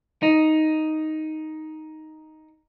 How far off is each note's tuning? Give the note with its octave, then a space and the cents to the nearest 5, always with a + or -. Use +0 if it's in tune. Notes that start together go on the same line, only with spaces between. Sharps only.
D#4 +5